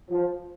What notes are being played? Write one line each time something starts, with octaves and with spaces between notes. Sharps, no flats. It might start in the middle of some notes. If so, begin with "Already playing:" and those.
F3